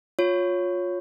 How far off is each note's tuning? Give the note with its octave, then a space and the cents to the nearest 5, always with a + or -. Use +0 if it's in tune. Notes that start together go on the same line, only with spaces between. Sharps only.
F4 +20 C#5 +0